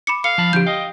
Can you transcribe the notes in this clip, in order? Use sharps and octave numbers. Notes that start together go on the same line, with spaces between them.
B5 D6 C#7
A4 F5 C#7
F3 A5 B5
D3 F3 E4 G4 G6
D#5 F5 G5